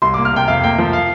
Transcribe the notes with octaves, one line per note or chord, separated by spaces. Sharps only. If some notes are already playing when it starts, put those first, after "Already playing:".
C2 C6
A#3 D6
F6
C3 G5
F2 F5
A#3 G5
F3
F5